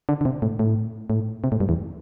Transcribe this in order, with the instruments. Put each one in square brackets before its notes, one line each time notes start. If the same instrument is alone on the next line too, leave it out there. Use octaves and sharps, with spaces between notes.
[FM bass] D3
D3
C3
A2
A2
A2
C3
A2
G2
E2